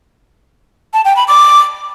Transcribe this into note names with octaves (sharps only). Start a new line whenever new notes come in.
A5
G5
B5
D6